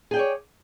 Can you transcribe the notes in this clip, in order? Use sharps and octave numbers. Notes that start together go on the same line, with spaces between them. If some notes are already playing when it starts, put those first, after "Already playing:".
G#4 C#5 D5 G5